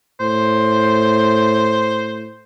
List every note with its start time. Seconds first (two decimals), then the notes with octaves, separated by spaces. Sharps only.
0.20 A2 C5